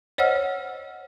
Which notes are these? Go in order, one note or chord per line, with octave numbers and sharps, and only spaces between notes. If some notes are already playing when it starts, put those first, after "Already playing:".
C5 C#5 D#5 F#5 E6 F6